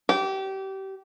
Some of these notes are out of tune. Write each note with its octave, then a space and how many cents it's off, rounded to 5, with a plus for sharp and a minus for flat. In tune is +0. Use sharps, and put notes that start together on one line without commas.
G4 -25